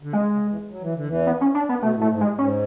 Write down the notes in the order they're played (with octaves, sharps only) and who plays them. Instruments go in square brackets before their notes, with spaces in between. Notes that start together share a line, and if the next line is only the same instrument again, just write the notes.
[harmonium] D3
[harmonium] C#3 [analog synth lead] G#3
[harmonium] C#3
E2 E3
F#3
E3
D3
E2 E3
[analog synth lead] B3
C#4
D4
B3
[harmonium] B2 [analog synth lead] A3
[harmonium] A2
[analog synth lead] A3
[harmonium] G#2
[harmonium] A2 [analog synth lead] G#3
[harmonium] G#2 [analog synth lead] C#4